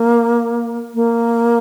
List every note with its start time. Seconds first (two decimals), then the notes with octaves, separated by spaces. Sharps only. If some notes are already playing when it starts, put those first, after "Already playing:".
Already playing: A#3
0.95 A#3